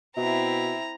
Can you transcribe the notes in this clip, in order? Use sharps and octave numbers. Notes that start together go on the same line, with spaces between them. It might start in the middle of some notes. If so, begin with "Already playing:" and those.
B2 C4 E4 E5 A#5